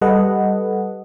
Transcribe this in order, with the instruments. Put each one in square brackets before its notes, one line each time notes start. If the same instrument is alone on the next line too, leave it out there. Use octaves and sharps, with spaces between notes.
[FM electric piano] G3 A4 B4 D#5 F#5